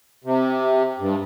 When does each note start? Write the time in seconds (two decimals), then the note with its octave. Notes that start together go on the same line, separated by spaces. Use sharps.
0.24 C3
1.00 G2